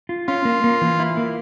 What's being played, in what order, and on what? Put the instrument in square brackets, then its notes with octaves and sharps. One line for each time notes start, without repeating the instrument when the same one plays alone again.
[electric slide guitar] F4
[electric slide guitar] C#4 [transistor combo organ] F4
[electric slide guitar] A#3
A#3
E3
E4
A#3